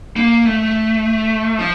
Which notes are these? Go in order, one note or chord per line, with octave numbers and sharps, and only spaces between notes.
A#3
A3
F3